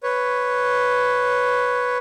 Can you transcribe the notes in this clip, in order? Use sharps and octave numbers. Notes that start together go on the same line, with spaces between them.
B4 C#5